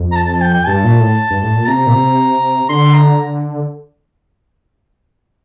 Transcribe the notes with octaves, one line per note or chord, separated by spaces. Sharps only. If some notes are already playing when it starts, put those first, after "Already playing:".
Already playing: F2
A#5
A5
A5
G5
G5
G2 A5
A#2
A2
G2
A2
A#2
C3 A#5
A#2
C3
D3 C6
A#5